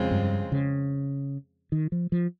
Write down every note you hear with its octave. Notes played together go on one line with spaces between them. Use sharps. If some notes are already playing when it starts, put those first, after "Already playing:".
Already playing: F2 C#3 G#3 C4 F4
G2
C#3
D#3
F3
F3